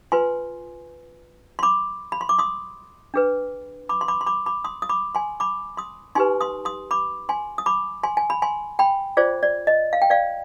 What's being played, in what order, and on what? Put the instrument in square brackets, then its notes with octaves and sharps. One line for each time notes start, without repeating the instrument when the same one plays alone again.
[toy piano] F4 B4 G#5 C6
C6
B5 D6
B5
C6
D6
C6 D#6
D4 G#4 B4
B5 D6
C6
B5 D6
C6
B5 D6
B5 D6
C6 D#6
D#6
B5 D6
G#5 C6
B5 D6
C6 D#6
D#4 G4 B4 G#5 C6
C6 D#6
C6 D#6
B5 D6
G#5 C6
D#6
B5 D6
G#5 C6
G#5
B5
G#5 C6
G5 B5
F4 G#4 C5 D5
D5
D#5
F5
G5
D5 F5